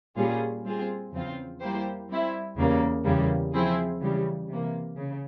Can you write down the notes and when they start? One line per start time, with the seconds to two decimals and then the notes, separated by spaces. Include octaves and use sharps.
0.16 A#2 G3 C#4 F4 G#4
0.64 G3 C4 F4 G#4
1.12 E2 C#3 F3 C4 F4
1.61 G3 A#3 E4 G4 C5
2.08 G3 C4 E4
2.57 E2 C#3 G3 A#3
3.04 E2 C#3 G3 A#3
3.53 F3 C4 E4 G#4
4.02 C#3 E3 G3
4.49 C3 E3 A#3
4.97 C#3